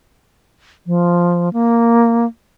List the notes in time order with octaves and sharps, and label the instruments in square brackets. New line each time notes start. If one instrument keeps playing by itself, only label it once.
[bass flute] F3
A#3